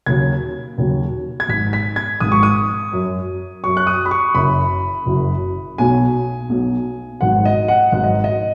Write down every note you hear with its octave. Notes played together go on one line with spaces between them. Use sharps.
D#2 C#3 F#3 G#6
D#2 C#3 F#3
G#6
G#1 G#2 G#3 B6
B6
G#6
G#1 G#2 G#3 D#6
C#6
D#6
F#2 F#3
F#2 F#3 C#6
F#6
D#6
B5
C#6
F#1 F#2 F#3 B5
F#1 F#2 F#3
B1 B2 F#3 G#5
B1 B2 F#3
G#1 G#2 F#3 F#5
D#5
F#5
G#1 G#2 F#3 F#5
D#5
D#5